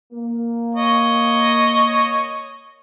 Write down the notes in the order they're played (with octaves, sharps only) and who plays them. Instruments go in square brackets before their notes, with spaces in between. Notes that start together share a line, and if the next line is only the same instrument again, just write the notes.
[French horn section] A#3
[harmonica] C#5 D#5